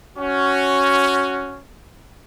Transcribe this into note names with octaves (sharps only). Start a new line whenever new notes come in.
C#4 F#4